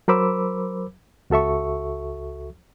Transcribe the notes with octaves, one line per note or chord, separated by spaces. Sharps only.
F#3 A#4 C5 B5 D6 E6
C#2 F#4 A4 E5 C#6